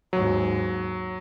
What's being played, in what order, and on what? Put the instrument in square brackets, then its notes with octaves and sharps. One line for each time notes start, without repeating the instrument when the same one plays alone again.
[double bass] D#2 G#2 [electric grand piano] F#3